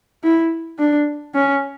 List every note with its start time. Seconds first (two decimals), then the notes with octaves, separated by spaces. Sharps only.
0.24 E4
0.79 D4
1.34 C#4